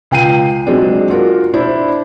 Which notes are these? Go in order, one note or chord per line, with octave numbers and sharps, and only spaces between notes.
C#2 G5 C7 D#7
F#3 G#3 C4 D4
F4 F#4 A#4
D4 E4 C5